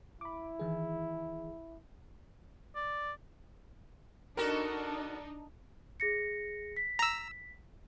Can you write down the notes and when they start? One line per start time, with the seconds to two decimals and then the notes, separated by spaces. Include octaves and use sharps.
0.21 E4 B5 D6
0.59 D#3 E3 G#4
2.76 D5
4.37 B3 D4 D#4 F#4 A4 A#4
6.00 G#4 A#6 C#7
6.77 B6
6.99 A#5 E6